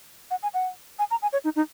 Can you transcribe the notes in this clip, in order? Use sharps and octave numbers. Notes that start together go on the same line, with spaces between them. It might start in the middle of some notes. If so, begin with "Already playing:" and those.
F#5
G#5
F#5
G#5
A#5
G#5
C#5
D#4
D#4